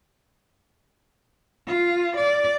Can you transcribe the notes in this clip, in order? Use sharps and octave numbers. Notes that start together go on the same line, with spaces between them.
F4
D5